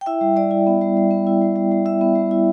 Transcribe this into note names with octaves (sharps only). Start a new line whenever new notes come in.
G5
E4 E5
G3
G3 D5
E4
B3
G3
G3
B3
E4
G3
G3
G3
E4 E5
B3
G3
E4